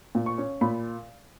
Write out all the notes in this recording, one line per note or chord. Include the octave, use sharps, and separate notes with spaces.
A#2
C#6
C#4
A#2 B5